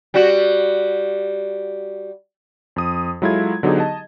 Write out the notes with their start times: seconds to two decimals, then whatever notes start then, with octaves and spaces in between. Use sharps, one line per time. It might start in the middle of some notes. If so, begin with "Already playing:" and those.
0.14 G3 F#4
2.76 F2 D#6
3.22 F#3 G#3 E4 F4 A4 G#6
3.63 D3 F#3 B3 D#4 G4 G#4
3.78 D#5 A5